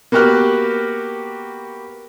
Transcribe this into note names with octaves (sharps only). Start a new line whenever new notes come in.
A#3 B3 F#4 G4 F6 F#6